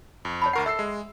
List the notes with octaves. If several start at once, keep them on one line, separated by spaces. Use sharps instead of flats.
F2
C#5 A5 B5
D2 A#4 F#5 C#6 C7
A4 E5 E6 C7
G#3